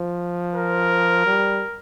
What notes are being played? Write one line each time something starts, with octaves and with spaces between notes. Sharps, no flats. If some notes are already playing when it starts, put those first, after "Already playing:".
Already playing: F3
A#4
G3